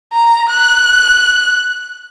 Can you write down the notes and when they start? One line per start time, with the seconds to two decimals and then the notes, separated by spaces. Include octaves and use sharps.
0.13 A#5
0.50 F#6